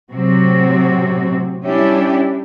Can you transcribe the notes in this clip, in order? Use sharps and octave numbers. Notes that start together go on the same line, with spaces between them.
A2 C3 F#3 C4 F#4
G3 C#4 D4 E4 G4